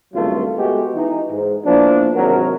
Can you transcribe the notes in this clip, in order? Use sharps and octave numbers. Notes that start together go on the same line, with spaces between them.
G#1 C#2 G2 F#3 A3 F4
G#3 A3 B3 F#4 G4
E3 D#4
G#2
E3 F3 A#3 B3 D4
G#1 C3 F#3 A#4